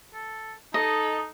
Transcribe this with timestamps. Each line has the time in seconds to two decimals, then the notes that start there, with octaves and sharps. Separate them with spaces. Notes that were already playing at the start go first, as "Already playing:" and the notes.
0.14 A4
0.74 D#4 A4 D#5